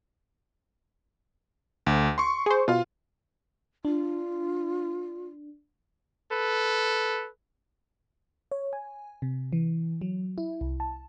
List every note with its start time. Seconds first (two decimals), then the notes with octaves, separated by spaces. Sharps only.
1.86 D2
2.18 C6 C#6
2.46 G#4 C5
2.68 B2 F4 F5
3.85 D4 F4
6.31 A4 B4
8.52 C#5
8.73 G#5
9.22 C3
9.53 E3
10.01 F#3
10.38 E4
10.61 C2
10.80 A5